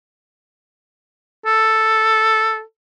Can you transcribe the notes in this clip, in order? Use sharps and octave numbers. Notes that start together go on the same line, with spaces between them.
A4